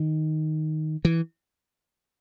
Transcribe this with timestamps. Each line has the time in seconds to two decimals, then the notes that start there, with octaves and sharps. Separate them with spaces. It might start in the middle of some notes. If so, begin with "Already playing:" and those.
Already playing: D#3
1.05 E3